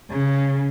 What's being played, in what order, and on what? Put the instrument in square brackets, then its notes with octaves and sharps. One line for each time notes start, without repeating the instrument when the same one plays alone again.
[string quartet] C#3